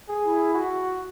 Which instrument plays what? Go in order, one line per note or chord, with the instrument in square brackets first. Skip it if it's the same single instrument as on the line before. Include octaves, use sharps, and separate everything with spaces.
[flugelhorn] G#4
[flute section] E4
[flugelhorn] F#4